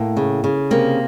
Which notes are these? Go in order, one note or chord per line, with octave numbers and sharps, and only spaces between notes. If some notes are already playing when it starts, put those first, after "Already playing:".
Already playing: A2 A#3
C#3
C#3
C3 A#3